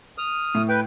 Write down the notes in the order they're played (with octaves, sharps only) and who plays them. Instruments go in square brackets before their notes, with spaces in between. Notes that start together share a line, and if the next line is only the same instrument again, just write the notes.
[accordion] D#6 F6
[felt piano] A2
[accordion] B4 G5